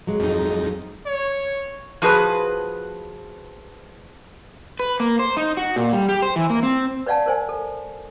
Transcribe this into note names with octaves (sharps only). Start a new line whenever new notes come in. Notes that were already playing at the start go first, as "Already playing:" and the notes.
F#3 G#3
F2 D#4
C#5
F3 F#4 G#4 B4
B4
A#3
C5
D#4
F#4
A#2
G3
G4
C5
E3
A#3
C4
B4 C#5 D5 F5 F#5 A5
A#4 C5 G#5
A4